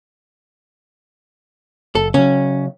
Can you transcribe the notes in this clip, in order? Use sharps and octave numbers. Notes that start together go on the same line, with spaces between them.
F#1 A4
C#3 F#3 C#4